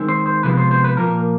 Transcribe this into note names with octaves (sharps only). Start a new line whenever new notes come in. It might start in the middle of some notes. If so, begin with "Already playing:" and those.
Already playing: D#3 G#3 C4
C5
C5
C3 F3 G#3 B3 B4
C5
C5
B4
A#2 F3 A#3 A#4